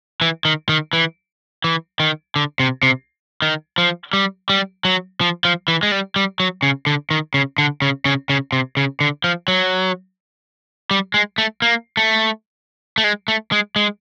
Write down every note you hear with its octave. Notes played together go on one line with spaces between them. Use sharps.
E3
D#3
D#3
E3
E3
D#3
D3
C3
C3
D#3
F3
G3
G3
F#3
F3
F3
E3
G#3
G3
G3
F#3
C#3
D3
D#3
C#3
D3
C#3
C#3
C#3
C3
C#3
D3
F3
F#3
G3
G#3
A3
A#3
A3
A3
G#3
A3
G#3
G#3